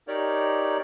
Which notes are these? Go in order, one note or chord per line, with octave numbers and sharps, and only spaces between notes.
D#4 G4 A#4 C#5 D5